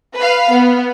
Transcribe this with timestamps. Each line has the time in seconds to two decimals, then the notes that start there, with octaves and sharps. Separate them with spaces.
0.15 B4 F5
0.51 B3